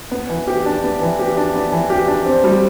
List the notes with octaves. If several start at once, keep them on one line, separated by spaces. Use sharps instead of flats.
B3
E3
G4
D4
B3
E3
G4
D4
B3
E3
G4
D4
C4
G3